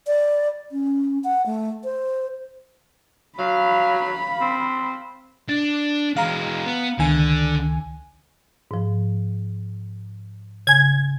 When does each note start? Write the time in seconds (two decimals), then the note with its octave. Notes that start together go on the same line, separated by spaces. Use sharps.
0.07 D5
0.72 C#4
1.24 F#5
1.46 A3
1.84 C5
3.39 F#3 F5 B5
4.41 C4
5.49 D4 A6
6.17 E3 G#3 F5 A#5
6.66 B3
6.99 C#2 D3 D#3 G#5
8.71 G#2 F3
10.67 C#3 G#5 G#6